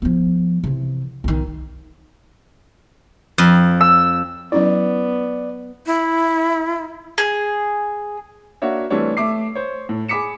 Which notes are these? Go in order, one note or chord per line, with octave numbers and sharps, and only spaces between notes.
F3 B3
C3 E3
B1 D#3
F2
E6
F#3 B3 C#4 E4 D5
E4
G#4
A#3 D4 F#4 C#5 E5
E3 G3 A3 C4 D4 C#5
A3 E5 D6 C7
C5 C#5
A2
G#4 B5 D6 B6 C#7 E7